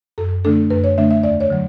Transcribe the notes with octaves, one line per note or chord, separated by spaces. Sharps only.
F#2 A4
D3 A3 D4 A4
F#2 B4
C#5
D3 A3 D4 E5
E5
E2 D5
C#5
D3 F#3